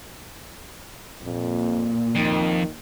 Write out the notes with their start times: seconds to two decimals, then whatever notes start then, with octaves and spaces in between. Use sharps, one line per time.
1.23 F2 A#2
2.16 F2 D#3